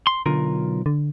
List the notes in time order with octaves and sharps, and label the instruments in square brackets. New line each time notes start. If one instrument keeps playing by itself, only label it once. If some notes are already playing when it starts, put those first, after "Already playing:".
[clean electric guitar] C6
[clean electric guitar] B1 F4 A#4 [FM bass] D3
[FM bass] D3